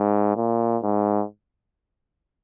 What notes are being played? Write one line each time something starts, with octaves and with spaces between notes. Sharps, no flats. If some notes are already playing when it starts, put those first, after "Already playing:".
Already playing: G#2
A#2
G#2